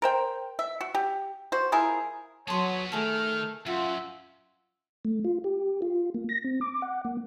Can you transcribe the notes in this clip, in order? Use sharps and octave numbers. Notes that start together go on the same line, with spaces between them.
A#4 C5 G5
E5
F#4
G4
F#4 C5
F3 E4 G#4 A#4
F#3 B3 G#4 C#5 A5 C6
D#3 A3 G#4 A4 F6
F#2 F4 F#4 E5
A3
F4
G4
F4
A#3
A#6
C4
D6
F#5
A#3